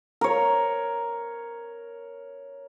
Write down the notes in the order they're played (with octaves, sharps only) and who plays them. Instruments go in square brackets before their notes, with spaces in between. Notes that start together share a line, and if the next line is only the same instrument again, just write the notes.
[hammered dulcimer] A#4 C#5